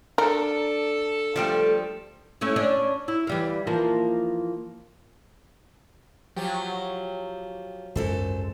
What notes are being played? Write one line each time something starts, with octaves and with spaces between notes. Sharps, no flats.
D4 A4 A#4
F3 G3 A3 D4 G5
A3 C#4 E4
C#4 D4
E4
E3 G3 F5
E3 F3 A#3
F3 F#3 G4
G#1 C#2 F#2 A4 C5